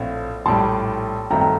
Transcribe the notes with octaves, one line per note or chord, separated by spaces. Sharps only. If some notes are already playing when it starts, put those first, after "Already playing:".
Already playing: A#1 A2 A3 C4 F5
A#1 A2 G3 A5 C6
G2 D#3 A3 C4 G5 A#5
G5 A#5